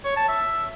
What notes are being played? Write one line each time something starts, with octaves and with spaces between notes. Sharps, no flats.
C#5
A5
E5